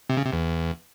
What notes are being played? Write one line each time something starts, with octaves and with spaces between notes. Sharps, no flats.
C3
C#3
C3
E2